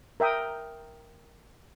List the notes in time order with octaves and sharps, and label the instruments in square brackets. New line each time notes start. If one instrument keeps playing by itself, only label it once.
[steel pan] A#4 E5 G5 D#6